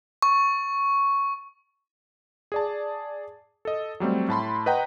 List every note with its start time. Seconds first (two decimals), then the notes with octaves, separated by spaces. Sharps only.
0.22 C#6
2.52 G#4 D5 A5
3.65 A4 D#5
4.00 F#3 G3 A3 C4
4.29 A2 A5 B5 C6
4.66 B4 D#5 F#5 G5 A#5